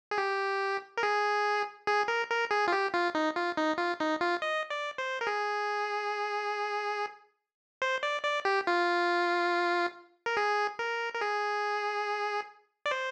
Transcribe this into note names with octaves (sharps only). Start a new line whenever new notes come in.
G#4
G4
A#4
G#4
G#4
A#4
A#4
G#4
F4
G4
F4
D#4
F4
D#4
F4
D#4
F4
D#5
D5
C5
A#4
G#4
C5
D5
D5
G4
F4
A#4
G#4
A#4
A#4
G#4
D5
C5